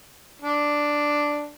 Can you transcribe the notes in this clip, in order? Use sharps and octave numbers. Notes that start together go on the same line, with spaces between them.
D4